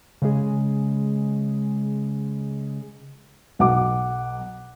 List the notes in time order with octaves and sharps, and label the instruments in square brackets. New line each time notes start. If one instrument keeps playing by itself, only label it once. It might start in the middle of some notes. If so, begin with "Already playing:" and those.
[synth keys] C#3 G#3 G#4
[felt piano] B1 F#5 D6